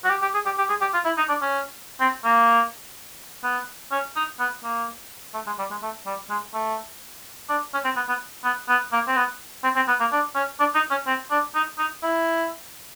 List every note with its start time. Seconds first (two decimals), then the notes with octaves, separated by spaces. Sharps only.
0.04 F#4
0.10 G4
0.22 G4
0.34 G#4
0.46 G4
0.58 G4
0.69 G#4
0.81 G4
0.94 F4
1.05 E4
1.17 D#4
1.29 D4
1.42 C#4
2.00 C4
2.24 A#3
3.43 B3
3.92 C#4
4.16 D#4
4.39 B3
4.64 A#3
5.34 A3
5.47 G#3
5.59 G3
5.71 G#3
5.82 A3
6.06 G3
6.30 G#3
6.54 A3
7.49 D4
7.74 C#4
7.85 C4
7.96 B3
8.09 B3
8.44 B3
8.69 B3
8.92 A#3
9.08 C4
9.17 B3
9.64 C4
9.76 C4
9.88 B3
10.00 A#3
10.12 D4
10.35 C#4
10.60 D4
10.75 D#4
10.91 C#4
11.07 C4
11.31 D4
11.55 D#4
11.78 D#4
12.03 E4